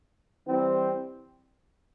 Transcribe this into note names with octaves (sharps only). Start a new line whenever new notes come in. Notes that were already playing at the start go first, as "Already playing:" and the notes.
E3 G3 C4